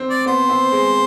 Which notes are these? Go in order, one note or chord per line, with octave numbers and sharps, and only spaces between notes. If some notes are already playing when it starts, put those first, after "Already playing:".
Already playing: C4
D5
B3 C5
C4
G#3